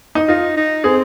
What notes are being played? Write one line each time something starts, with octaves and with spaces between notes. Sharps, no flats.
D#4
D#4 F4
D#4
C4 G#4